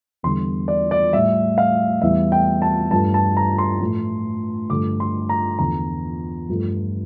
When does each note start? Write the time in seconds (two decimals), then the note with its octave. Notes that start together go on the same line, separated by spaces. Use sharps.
0.23 E2 D3 G3 C6
0.68 D5
0.91 D5
1.12 A2 G3 E5
1.58 F5
2.02 E2 E3 G3 E5
2.32 G5
2.62 A5
2.91 G2 F3 A3 A5
3.14 A5
3.37 A#5
3.58 C6
3.80 A2 F3 A3
4.70 G2 D3 F3 A3 D6
5.00 C6
5.29 A#5
5.59 E2 D3 F3 A#5
6.49 G2 F3 A3